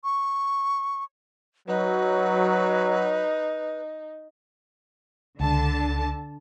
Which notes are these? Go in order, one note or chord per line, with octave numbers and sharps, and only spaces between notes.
C#6
F#3 D#4 B4
C#2 D3 A5